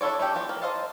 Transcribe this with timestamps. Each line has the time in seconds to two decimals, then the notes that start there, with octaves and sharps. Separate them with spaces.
0.01 D4 E4 A4 C#5 D5
0.19 A3 D4 G4
0.34 E3 F3 B3
0.49 A#3
0.62 C5 D#5 F5 A5